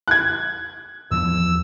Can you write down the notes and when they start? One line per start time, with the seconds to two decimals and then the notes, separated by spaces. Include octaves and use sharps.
0.08 F#6 G#6
1.11 E2 F3 B3 E6